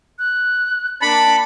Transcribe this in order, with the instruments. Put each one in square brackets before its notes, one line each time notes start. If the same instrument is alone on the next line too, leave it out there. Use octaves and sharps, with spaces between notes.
[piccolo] F#6
[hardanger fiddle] A#3 D4 [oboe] A5 [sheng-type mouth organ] B5 [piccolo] C#7